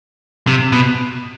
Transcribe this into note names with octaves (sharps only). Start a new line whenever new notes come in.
C3
B2